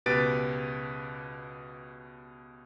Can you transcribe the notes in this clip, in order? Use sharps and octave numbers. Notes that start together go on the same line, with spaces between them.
C#2 B2 G4 B4 A6 D7